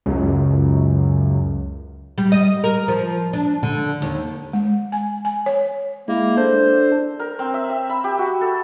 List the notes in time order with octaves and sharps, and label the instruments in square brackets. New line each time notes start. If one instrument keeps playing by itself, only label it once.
[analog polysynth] C#2 F#2
[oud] G3
D#5
A#4
F3
D4
D3
D#2
[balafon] G#3
G#5
G#5
C#5
[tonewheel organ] G#3 E4 [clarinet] A#3
[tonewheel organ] D4 A4 [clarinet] C5
[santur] A#4
C4
E5
E5
B5
G4
F#4
A4